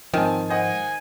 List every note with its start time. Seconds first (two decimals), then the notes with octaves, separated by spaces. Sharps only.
0.14 G#2 D#3 F3 C4 G#5 A5
0.50 C5 D#5 F#5 G#5